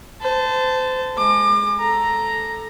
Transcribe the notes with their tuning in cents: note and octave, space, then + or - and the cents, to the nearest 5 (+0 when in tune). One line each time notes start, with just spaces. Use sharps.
C5 -30 A5 +0
G#3 +0 D6 +35
A4 +0 A#5 +0